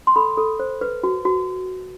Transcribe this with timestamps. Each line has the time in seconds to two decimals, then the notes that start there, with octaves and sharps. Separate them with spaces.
0.07 C6
0.16 A4 B5
0.37 A4
0.59 C5
0.81 B4
1.03 F#4
1.25 F#4